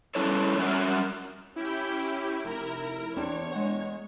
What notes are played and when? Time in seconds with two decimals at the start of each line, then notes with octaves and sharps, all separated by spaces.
0.15 G3 C#4 E4 A4 C#5
0.58 G3 C#4 F#4 A#4 E5 F#5
1.56 C#4 E4 G4 G5
2.45 F1 E4 A#4
3.16 E2 C4 D4 G4 C#5
3.52 G#3 F#5